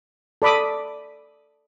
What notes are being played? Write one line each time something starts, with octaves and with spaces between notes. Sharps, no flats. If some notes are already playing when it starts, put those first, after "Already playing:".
A4 D5 B5 D6 D#6